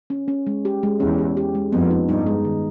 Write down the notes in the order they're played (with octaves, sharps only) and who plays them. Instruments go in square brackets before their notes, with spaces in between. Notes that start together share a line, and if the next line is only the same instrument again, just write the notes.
[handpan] C#4
C#4
G#3
G4
G#3
[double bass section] E2 [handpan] C#4
[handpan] G4
G4
G#3
[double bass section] F2 [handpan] B3
[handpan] D#4
[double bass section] G2 [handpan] D#4
[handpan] G#3
D#3